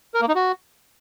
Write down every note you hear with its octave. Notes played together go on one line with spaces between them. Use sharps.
A#4
A#3
D#4
F#4